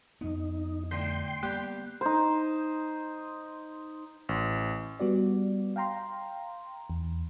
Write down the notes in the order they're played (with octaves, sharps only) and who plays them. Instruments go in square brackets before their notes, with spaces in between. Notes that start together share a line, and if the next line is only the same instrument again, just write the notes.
[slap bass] F2 B3 [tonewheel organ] D#4
[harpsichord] A2 D3 [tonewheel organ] G5 C6
[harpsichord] G3 G4 [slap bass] A#3 B3 [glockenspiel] F#6 G6
[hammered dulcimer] D#4 C5
[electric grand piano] A1
[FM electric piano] G3 B3 F#4 D5
F5 G5 A#5 C6
E2